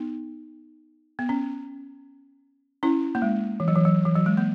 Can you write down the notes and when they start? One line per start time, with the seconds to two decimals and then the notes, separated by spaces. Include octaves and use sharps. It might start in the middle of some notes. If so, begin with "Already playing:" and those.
Already playing: B3 D#4
1.19 B3
1.29 C#4
2.83 C#4 E4
3.15 A#3
3.22 G#3
3.60 E3
3.68 F#3
3.75 E3
3.85 F#3
4.05 E3
4.16 F#3
4.26 G#3
4.37 A#3